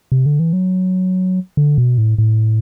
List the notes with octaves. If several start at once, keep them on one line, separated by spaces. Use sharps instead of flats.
C3
D3
E3
F#3
D3
B2
A2
A2